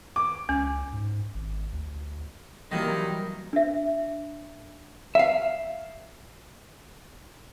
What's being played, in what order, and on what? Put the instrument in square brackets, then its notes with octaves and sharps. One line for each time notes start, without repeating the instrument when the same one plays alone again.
[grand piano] D6
[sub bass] C#2 [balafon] C#4
[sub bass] G#2
G#1
D2
[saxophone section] C3 D#3 [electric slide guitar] E3 F#3 A#4 [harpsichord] G3 A#3 E4
[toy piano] D4 E5
[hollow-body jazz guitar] E5 F5